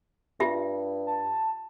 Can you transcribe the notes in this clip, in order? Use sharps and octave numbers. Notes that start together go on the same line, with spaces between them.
G2 F4 G4 E5
A5